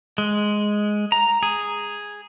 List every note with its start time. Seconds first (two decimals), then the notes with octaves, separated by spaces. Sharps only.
0.18 G#3
1.12 A#5
1.43 G#4